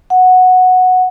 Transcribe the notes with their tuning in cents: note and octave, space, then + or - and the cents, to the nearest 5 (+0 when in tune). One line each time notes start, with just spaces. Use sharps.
F#5 -5